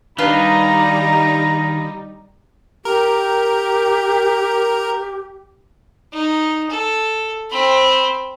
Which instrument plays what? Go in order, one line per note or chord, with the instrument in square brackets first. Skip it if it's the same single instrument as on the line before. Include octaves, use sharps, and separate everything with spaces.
[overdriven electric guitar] D#3 [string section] G3 D#4 [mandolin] D4 F4 B4 [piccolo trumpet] A#5
[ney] G4 [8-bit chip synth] A#4
[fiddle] D#4
A4
C4 B5